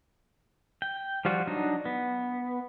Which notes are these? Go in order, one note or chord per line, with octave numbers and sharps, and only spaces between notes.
G5
F3 G3 F4 F#4
F#3 D4 D#4
B3